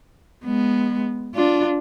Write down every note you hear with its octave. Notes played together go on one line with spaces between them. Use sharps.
G#3 B3
D4 F4